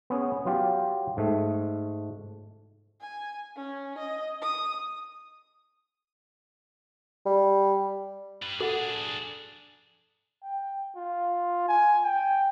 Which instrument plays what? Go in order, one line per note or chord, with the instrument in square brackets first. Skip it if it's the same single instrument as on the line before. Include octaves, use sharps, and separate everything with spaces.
[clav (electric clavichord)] B3 C#4 G#4
F#3 F4 G4
G#2 A3
[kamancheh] G#5
C#4
D#5
D#6
[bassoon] G3
[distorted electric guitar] G3 B4
[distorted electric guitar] D4 G#4 [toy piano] A4 F#5
[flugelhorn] G5
F4
G#5
G5